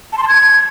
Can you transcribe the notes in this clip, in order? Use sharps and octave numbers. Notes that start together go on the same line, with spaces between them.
A5
C6
A5
G#6